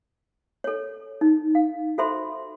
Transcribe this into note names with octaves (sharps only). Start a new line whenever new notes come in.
A4 C#5
D#4
F5
F#4 A4 C5 E5 B5 C6